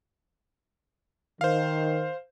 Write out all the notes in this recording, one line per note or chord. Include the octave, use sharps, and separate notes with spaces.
D#3 C5 F5